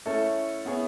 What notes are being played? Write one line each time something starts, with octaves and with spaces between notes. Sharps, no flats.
A3 C#4 E4 A4 C#5
B3 E4 G#4 C#5